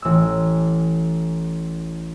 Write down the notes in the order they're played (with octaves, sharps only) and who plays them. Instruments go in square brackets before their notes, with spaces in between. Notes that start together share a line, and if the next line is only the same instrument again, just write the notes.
[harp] A1 E6